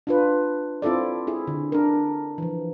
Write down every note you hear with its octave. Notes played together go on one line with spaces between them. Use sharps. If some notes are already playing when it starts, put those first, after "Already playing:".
D4 F4 B4
C4 E4 F4 A4 D5
E4 G#4
D3
D4 A#4
E3 F3